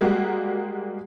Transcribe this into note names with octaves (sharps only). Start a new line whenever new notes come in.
G3 G#3 A#3 F#4 G4